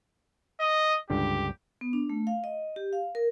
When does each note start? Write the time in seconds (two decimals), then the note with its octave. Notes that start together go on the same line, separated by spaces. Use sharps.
0.60 D#5
1.10 C#2 G2 D3 G4
1.81 B3
1.93 D4
2.10 A3
2.27 F5
2.44 D#5
2.76 G4
2.93 F5
3.15 A#4